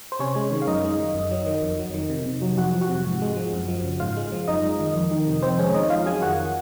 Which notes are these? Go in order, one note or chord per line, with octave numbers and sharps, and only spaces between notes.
C5
C3 C#4 C#5
G#3
D#3
F5
F#2 D#4 D#5
G#3
D#3
F#2
F#3
D#3
F2
F#3
D#3
C3
C3
F#3
F2 F#4 F#5
F3
F#4 F#5
C3
G#2
G#3
F3
F#2
F3
C#3
G#2 F4 F5
G#3
F3
F#2 D#4 D#5
G#3
D#3
F2
D#3
C3
F2 C4 C5
G#3 C#4 C#5
D#3 D#4 D#5
F2 F4 F5
F#3 G#4 G#5
D#3 F#4 F#5